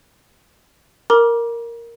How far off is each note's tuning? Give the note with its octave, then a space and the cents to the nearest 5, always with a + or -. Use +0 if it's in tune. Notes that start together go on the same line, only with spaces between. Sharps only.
A#4 +0 A#5 +40 D6 +0